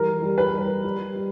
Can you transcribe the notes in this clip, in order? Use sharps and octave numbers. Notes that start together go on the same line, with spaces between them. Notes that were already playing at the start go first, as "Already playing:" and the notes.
Already playing: E3 G3 A#4
G3
B4
G3
G3
G3